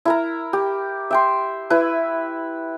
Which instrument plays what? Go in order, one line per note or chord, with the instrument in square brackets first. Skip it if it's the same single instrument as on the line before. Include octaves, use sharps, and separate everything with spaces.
[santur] E4 A#4 A#5
G4
E5 G5 C6
E4 B4